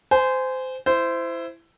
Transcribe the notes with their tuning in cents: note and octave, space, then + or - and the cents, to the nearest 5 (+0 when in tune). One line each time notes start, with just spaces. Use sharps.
C5 -20 G#5 +0
E4 +15 C5 -15